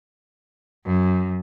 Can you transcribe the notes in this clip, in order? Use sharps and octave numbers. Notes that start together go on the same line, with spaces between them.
F#2